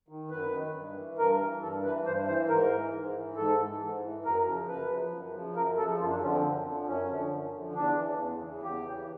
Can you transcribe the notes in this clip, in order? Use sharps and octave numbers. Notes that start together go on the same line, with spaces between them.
D#3
F#2 B4
D#3
G2
E3
G2 A#4
E3
G2 A4
E3 B4
G2 C5
E3 C5
G#2 A#4
E3
G#2
E3
G#2 A4
E3
G#2
E3
F#2 A#4
C#3 F3
F#2 B4
C#3 F3
F#2
C#3 F3
F#2 A#4
C#3 F3 A4
F#2 F4
D4
D3 F3 C#4
C4
F#2
D3 F3
F#2 C#4
D3 F3
F#2
D3 F3
E2 D4
C#3 E3
E2
C#3 E3
E2 G4
C#3 E3